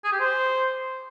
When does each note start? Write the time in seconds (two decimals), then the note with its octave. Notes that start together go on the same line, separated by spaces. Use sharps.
0.04 G#4
0.12 G4
0.20 C5